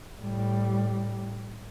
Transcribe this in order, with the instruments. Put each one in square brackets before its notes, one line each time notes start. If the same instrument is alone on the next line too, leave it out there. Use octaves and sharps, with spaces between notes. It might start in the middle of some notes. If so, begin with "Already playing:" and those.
[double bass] A2 G3